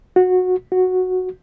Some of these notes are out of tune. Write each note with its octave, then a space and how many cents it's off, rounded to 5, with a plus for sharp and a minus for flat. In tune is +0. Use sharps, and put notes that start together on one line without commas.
F#4 -15
F#4 -5